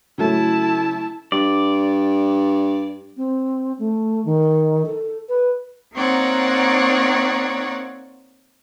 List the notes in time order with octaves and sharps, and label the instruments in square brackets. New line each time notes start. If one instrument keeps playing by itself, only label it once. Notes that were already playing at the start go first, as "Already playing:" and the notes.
[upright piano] C#3 F#3 A3 [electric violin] E4 A5
[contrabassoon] G2 [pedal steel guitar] D5
[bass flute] C4
A3
D#3
A4
B4
[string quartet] A#3 C4 D#4 C#5 D5 F#5